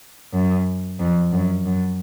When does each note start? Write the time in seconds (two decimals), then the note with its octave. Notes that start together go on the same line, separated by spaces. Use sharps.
0.33 F#2
1.00 F2
1.32 F#2
1.66 F#2